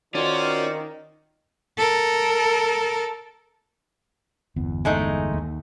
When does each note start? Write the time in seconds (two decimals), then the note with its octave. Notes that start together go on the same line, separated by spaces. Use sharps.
0.15 D#3 C#4 F4 F#4 C5 D5
1.78 A4 A#4
4.56 G1 E2
4.85 G#3 A3 D#4
5.33 D#2